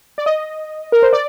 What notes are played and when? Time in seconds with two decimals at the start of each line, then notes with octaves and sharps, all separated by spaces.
0.18 D5
0.26 D#5
0.92 A#4
1.02 C5
1.13 D5